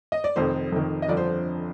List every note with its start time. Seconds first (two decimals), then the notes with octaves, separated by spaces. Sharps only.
0.12 D#5
0.24 D5
0.36 F1 F2 D#3 C5
0.72 F1 F2 D#3
1.02 D#5
1.08 G1 F2 D3 F3 D5
1.17 C5